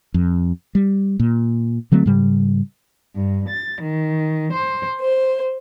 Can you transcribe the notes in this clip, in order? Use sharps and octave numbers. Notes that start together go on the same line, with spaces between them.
F2
G3
A#2
D3 F#3 A3 C4
G#2 C#3 G3
G2
A6
D#3
C5
C5